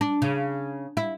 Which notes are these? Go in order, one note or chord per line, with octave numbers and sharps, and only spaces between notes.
D4
C#3
E4